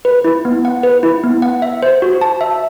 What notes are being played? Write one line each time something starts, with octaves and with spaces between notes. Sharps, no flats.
B4
E4
B3
F#5
B4
E4
B3
F#5
E5
C5
F#4
A5
E5